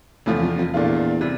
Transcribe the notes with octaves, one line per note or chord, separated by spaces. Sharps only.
E2 A2 C3 F3 A3
F2
F2
E2 A#2 A3 D4 F4
C3 G3